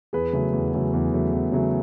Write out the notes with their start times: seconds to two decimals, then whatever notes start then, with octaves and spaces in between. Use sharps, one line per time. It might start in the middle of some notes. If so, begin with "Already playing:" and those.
0.13 E2 G#4 B4
0.33 C#3 F#3 A3
0.53 E2
0.74 C#3 F#3 A3
0.93 E2
1.13 C#3 F#3 A3
1.33 E2
1.52 C#3 F#3 A3